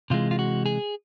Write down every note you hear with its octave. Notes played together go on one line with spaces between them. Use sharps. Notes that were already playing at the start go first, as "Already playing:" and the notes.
C3 E3 G#3 F4
F4
F#4
G#4